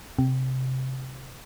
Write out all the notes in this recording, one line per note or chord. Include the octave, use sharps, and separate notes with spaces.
C3